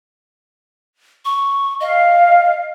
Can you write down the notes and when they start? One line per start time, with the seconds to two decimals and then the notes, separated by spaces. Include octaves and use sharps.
1.25 C#6
1.80 D#5 F5